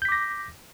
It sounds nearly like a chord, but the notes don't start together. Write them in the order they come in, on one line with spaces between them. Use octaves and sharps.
G6 B6 D6 A#6